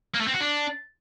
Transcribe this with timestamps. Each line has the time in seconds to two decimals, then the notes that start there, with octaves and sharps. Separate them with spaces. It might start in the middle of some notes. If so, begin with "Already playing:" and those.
0.14 A#3
0.21 A3
0.27 C4
0.34 F#4
0.40 D4